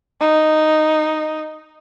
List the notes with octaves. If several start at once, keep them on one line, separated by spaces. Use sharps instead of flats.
D#4